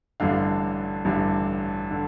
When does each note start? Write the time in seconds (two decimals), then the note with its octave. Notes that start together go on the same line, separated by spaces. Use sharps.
0.20 A1 G2 D3 F5
1.05 A1 G2 D3
1.91 D3